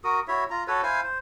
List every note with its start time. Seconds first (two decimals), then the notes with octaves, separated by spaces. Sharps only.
0.04 F#4 A#4 D#6
0.28 E4 F#4 C#5 E5
0.51 F4 A#5
0.68 F#4 A4 B4 C#5
0.83 E4 C5 F5 G#5
1.04 C5